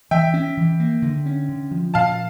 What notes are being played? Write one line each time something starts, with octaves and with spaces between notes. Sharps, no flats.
E3 E5 G5
C#4
E3
A#3
D3
C#4
D3
F3
A#2 F5 A5